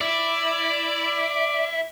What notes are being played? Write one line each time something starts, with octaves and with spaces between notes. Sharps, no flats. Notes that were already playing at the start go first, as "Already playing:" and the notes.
E4 D5